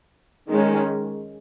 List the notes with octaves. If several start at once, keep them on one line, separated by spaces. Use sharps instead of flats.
D#3 G#3 C#4